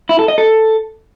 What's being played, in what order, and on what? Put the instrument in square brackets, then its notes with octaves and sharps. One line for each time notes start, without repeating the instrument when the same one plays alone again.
[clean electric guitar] E4
A4
D#5
A4